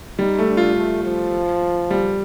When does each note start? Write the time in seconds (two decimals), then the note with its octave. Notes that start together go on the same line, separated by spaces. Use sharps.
0.19 G3 D#4
0.39 A3
0.48 D4
0.57 F4
0.76 A3
1.04 F3
1.91 G3